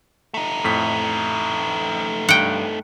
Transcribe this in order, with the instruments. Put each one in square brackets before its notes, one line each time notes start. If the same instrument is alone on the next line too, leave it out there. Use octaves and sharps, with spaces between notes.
[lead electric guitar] A3 D#4
[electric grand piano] F2 A2 B6
[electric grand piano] G2 [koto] F#5 G5